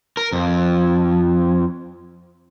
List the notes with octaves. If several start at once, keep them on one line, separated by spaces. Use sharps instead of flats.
A#4
F2